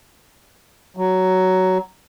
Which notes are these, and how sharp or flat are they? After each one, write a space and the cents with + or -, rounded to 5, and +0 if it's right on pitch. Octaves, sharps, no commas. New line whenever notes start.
F#3 +10